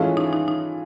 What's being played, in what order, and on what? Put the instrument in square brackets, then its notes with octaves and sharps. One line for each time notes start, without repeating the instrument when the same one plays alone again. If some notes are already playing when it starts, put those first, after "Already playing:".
Already playing: [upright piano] E3 G#3 C#4 F4 A4
[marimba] D#4
D#4
D#4